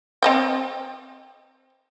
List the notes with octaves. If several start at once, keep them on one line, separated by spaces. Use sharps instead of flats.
C4 D#5 G5